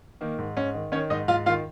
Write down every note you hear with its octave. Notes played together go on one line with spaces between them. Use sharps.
D#3 A#3
G#2
G#2 C#4
D#3
D#3 C#4 C#5
G#2 D#4 D#5
G#2 F4 F5
D#3 F4 F5